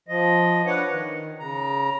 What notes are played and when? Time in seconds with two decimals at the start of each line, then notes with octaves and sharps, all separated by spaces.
0.08 F3 D#5
0.67 D4 B4 C#5 F#5
0.90 D#3
1.39 C#3 A#5